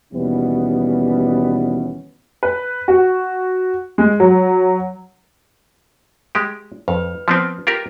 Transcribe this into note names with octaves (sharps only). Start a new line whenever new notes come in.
D#2 B2 E3 G3 B3 C#4
B4
F#4
G#3
F#3
G#3 G4
F2 B4
F3 B3 C4
F4 G4 A#4